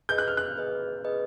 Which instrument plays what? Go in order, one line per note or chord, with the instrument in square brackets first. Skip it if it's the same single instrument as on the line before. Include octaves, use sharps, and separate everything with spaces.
[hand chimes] G#4 B4 D#5 [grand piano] G6
[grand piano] F#6
F6
F#6
[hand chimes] G#4 B4 D#5
G#4 B4 D#5